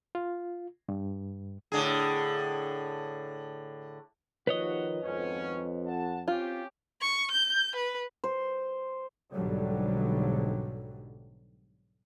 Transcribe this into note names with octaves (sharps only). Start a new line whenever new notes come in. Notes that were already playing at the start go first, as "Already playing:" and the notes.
F4
G2
A2 D3 G#4
D#2 D#3 F3 F#4 B4 C#5 D#5
G#1 F2 B3 C#4
F#5 A5
C4 C#4 F4 G4
C#6
G6
B4
C5
B1 G#2 D3 F#3 G3